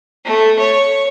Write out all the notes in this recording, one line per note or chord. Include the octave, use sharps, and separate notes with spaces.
A3
C#5